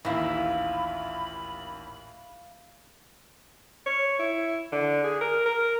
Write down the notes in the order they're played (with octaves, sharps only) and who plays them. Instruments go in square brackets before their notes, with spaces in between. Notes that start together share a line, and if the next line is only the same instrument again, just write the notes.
[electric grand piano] A1 D#2 E6 [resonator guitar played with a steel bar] A#2 E4 [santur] E5 F5 [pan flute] B5
[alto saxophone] C#5
E4
D3
G#4
A#4
A#4